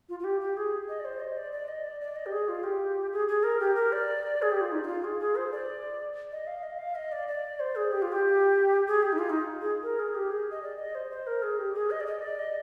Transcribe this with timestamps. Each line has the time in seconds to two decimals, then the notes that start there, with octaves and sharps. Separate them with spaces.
0.09 F4
0.20 F4
0.24 G4
0.41 G4
0.57 G#4
0.89 D#5
1.00 D5
1.05 C5
1.20 D#5
1.37 D5
1.52 D5
1.68 D#5
1.84 D5
2.01 D5
2.16 D#5
2.26 G4
2.32 G#4
2.48 F4
2.64 G4
3.12 G#4
3.28 G#4
3.43 A#4
3.60 G4
3.75 A#4
3.92 D5
4.42 G#4
4.52 G4
4.61 F4
4.72 D#4
4.83 D#4
4.87 F4
5.04 G#4
5.20 G#4
5.36 C5
5.52 D5
6.32 D#5
6.47 F5
6.63 D#5
6.79 F5
6.95 D#5
7.12 D5
7.28 D5
7.60 C5
7.76 G#4
7.92 G4
8.02 F4
8.12 G4
8.87 G#4
9.02 G4
9.13 D#4
9.19 F4
9.30 D#4
9.61 G#4
9.83 A#4
9.99 G#4
10.15 G4
10.30 G#4
10.51 D#5
10.62 D5
10.79 D#5
10.95 C5
11.10 C5
11.27 A#4
11.43 G#4
11.59 G4
11.74 G#4
11.91 D#5
12.00 D5
12.06 D#5
12.22 D5
12.39 D#5